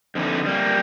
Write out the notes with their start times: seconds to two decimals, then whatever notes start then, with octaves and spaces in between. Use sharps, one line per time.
0.15 F2 D3 E3 D#4
0.46 G3 A#3